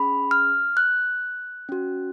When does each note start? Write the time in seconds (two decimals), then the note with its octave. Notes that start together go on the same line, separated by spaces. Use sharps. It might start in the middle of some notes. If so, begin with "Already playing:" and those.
Already playing: C#4 G#4 B5
0.31 F6
0.77 F#6
1.69 C#4 F#4